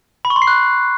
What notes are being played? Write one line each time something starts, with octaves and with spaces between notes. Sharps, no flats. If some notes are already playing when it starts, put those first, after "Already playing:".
B5
C#6
C6
C7
F#6